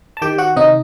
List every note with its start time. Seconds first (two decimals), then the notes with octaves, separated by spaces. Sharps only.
0.17 A5
0.22 D#3 G4 G5
0.38 F#4 F#5
0.56 C3 D#4 D#5